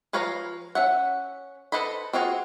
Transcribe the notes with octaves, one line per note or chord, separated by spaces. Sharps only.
F3 B4 C#5 F5 A#5
C#4 E5 F#5
A4 B4 C5 D#5 B5
C4 F4 F#4 G#4